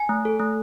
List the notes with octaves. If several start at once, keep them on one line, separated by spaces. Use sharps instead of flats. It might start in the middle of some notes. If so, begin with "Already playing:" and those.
Already playing: G#5
A3
A4
A3